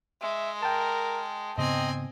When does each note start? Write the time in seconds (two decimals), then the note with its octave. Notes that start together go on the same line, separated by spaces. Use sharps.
0.22 G#3 E5
0.63 A#4 G5 A5
1.58 G#2 C#3 B3 C4 D#5 G#5